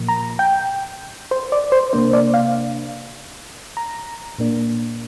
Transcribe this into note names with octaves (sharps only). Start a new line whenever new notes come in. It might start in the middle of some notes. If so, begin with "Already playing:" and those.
Already playing: A#2 F3 A#3
A#5
G5
C5
D5
C5
C3 A#3 D4 C5
D5
F5
A#5
A#2 A#3 D4